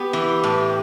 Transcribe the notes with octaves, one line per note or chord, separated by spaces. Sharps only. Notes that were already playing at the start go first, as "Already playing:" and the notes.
Already playing: B3 G4 B4
E3
A2